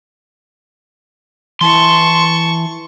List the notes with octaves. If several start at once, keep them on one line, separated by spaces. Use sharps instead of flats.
E3 A5 C6 C#6